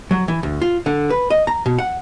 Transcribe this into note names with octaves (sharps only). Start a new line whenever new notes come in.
F#3
E3
D2
F4
D3
B4
D#5
A#5
B2
F#5